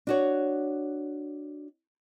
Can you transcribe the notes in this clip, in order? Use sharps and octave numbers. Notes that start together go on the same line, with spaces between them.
D4 F#4 C#5